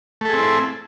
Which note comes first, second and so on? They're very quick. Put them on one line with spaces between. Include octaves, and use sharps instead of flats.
A3 A4 G#4 C4 E4